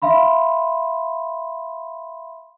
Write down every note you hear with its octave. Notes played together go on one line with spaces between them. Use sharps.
E5 F5 B5 C6